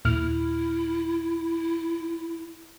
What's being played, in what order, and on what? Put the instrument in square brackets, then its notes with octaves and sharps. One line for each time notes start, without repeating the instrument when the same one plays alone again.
[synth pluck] D#2 A#2 F6 [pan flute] E4